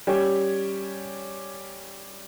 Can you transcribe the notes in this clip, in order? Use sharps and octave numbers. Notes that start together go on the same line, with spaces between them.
G3 C#4 G4 C#5